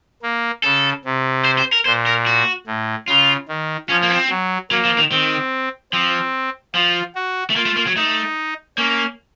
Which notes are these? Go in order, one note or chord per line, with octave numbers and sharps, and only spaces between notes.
A#3
C#3 A4
C3
C5
C5
A#4
A#2 C5
A#4
F#4
A2
C#3 F4
D#3
F3 C#4
A#3
C4
F#3
F#3 A#3
F3
D#3
D#3 C4
F3 C4
F3 F4
F#4
A3
A#3 F4
A3
A#3
F#3
A3 D#4
A#3 C#4